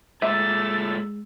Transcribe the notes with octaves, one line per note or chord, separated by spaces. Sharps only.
A#2 G#3 A3 E5 E6 A6